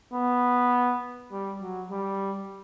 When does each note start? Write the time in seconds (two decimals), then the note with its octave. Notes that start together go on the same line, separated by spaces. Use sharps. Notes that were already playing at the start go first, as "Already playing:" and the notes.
0.14 B3
1.32 G3
1.62 F#3
1.91 G3